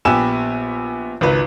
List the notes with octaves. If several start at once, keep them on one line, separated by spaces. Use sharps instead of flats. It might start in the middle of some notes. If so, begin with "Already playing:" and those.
A#1 B3 G4 G#5 E6 E7
G#1 C#2 B4